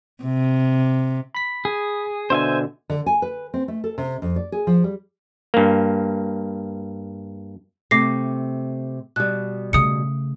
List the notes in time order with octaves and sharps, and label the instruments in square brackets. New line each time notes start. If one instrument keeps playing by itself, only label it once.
[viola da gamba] C3
[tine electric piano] B5 B6
[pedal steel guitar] G#4
[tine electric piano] B2 D3 [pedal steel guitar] C5 E5 G#5
[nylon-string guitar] D3
G#5
B4
C4
A3
A4
C3
F2
D5
G#4
F3
G3
[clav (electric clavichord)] G2 A#3
[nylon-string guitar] C3 A3 [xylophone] D6 A#6 C7
[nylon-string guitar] B2 G3 [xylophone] F#6
[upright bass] C#3 A3 [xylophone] D#6 C#7